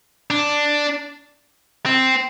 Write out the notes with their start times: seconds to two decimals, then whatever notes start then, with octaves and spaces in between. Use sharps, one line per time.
0.31 D4
1.86 C4